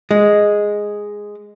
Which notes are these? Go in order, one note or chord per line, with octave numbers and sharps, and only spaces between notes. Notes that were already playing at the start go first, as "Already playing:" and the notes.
G#3